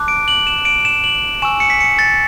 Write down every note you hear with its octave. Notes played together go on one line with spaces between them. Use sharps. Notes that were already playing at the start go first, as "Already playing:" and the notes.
Already playing: A5 D6 F#6
D7
F#7
E7
D7
E7
F#7
G#5 C#6 E6 E7
C#7
B6
C#7
A6